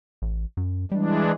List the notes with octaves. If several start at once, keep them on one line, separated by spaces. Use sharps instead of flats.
A1
F#2
E3 G3 G#3 D4